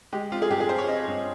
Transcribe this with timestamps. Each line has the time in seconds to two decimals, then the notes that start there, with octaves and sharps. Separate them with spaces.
0.13 G#3 G4
0.32 C4 F4
0.42 G#4
0.50 G2 G4
0.60 G#4
0.69 C4 C5
0.79 C#5
0.88 C4 D#5
1.07 G2